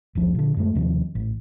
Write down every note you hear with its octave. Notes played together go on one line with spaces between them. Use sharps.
F1 C#2 F3
A#2 D3
F#2 G#3 A3
D#2 C3 D#3 F3
A1